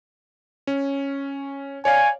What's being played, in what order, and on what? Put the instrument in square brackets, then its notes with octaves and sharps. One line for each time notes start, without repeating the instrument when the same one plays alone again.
[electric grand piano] C#4
[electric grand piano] C#5 D5 F5 [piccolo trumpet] G#5